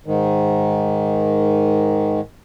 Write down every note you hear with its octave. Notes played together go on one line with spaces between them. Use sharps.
G#2 D#3